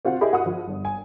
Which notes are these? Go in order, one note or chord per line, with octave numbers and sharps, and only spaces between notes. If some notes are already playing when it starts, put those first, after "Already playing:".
C4 F4 F#4 F#5
E4 G4 G#4 D#5 B5
F#4 F#5 D#6
F3
G1
G#5